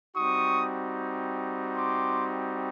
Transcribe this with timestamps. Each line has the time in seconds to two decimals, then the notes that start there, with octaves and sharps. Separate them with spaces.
0.16 G3 C4 D#4 F#4 C#6 D#6
1.77 C6 D6